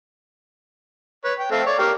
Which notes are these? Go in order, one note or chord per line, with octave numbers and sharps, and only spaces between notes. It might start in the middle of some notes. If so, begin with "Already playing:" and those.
B4 C#5
G5
A3 C4 F5
C#5 D5
A#3 G4